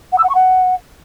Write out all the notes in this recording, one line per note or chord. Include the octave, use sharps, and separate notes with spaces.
F#5
E6
F#5
C#6
F#5